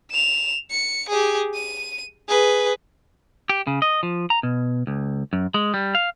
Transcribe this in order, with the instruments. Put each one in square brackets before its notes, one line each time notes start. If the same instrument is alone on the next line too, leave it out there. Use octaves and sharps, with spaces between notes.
[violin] E7 F7
C#7
G4 G#4
D#7
G#4 B4
[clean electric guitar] G4
C#3
D#5
F3
A#5
B2
C#2
F#2
G#3
G3
F5